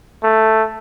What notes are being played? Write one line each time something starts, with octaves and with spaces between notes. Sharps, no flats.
A3